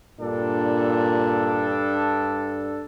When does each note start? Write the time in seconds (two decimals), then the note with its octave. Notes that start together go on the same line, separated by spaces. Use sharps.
0.20 G2 A#2 D4 A4